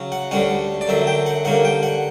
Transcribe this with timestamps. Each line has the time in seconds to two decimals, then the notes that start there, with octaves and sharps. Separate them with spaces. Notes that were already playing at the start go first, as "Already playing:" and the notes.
Already playing: C#3 F#3 C#4
0.12 F#5
0.31 D2 D3 G3 C#4 F#5
0.81 D5
0.88 F#2 D3 F#3 E5
1.07 G5
1.26 F#5
1.45 G2 D3 A#3 C#4 F#5
1.65 G5
1.83 F#5